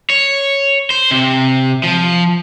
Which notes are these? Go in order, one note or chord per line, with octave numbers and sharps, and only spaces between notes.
C#5
C5
C3
F3